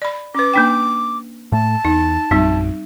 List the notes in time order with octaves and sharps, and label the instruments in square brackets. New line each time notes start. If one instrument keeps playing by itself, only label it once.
[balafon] D5 B5
[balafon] C#4 B4 [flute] D6
[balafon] A#3 D4 G5
[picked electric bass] A2 A3 [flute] A5
[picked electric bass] E2 [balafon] D#4
[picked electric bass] A#1 F#2 [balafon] G3 C4 D#4